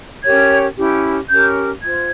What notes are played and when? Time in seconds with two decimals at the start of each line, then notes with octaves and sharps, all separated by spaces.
0.25 C#4 G4 A#4 C#5 G#6
0.77 C#4 E4 G4
1.30 C#4 G4 A#4 G6
1.82 F4 C5 G#6